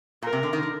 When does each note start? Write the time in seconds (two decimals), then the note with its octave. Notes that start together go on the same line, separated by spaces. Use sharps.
0.22 A#2 A#4
0.33 C3
0.43 D3
0.53 D#3
0.63 D3